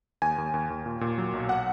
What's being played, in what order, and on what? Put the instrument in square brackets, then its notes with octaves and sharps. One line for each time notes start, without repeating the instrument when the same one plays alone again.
[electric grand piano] D#2 G#5
D#2
D#2
D#2
A#2
A#2
F#3
B1
F#5